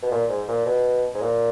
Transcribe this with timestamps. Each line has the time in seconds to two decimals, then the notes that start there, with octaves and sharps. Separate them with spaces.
0.03 B2
0.11 A#2
0.29 G#2
0.48 A#2
0.66 B2
1.15 G#2
1.22 A#2